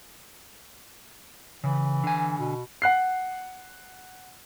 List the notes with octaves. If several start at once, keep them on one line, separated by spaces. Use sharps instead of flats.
C#3 E3
D3 G#5
B2
F#5 F#6 C7